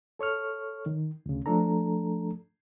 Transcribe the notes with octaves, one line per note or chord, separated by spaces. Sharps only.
A4 C#5 C#6 F6
D#3
D2 C#3
F3 A3 D4 A4 A#5